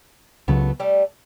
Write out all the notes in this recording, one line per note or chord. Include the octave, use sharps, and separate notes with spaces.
C#2 C#3 F#3 A3 B3
G3 A3